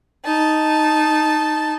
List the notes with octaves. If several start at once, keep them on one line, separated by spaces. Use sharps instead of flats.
D#4 A5